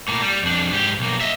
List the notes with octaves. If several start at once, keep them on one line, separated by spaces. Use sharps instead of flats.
A2 A#3
G3
F2 D4
G#2 G4
B1 A#3
D#5 E5